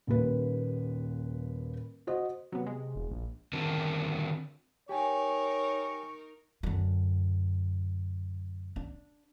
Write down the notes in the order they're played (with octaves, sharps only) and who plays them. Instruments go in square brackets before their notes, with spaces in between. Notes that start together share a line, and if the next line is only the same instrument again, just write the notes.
[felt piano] D#1 D#2 B4
F#4 C5 D#5
[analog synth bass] C3 [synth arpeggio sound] F#3 B3
[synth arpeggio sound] G#3
[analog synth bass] E1
A#1
[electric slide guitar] D3 D#3 C4 A#4
[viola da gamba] D#4 A#4 [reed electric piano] G4 G5 G#5 [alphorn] C#5 [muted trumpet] C#6
[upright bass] F#2 D3
D4